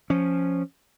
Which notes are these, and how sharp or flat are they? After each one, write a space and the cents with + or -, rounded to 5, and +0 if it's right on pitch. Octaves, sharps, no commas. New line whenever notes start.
F3 +0 C#4 +0